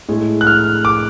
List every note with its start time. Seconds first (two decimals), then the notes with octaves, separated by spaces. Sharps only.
0.09 A2 G#3
0.41 F#6
0.47 F6
0.85 D6